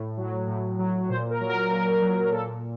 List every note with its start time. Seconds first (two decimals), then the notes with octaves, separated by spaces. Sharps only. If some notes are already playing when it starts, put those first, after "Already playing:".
Already playing: A2
0.17 F#3
0.47 A2
0.79 F#3
1.10 A#2 C5
1.30 A#4
1.40 F#3
1.49 A#4
1.70 A#2 A#4
2.02 F#3
2.31 A#2 A4